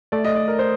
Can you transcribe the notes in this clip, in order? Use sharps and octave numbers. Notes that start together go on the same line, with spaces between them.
A3 D5
D#5
D5
A#4
C5